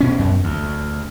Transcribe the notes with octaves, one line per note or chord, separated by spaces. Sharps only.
B2 C#4
F#2
D2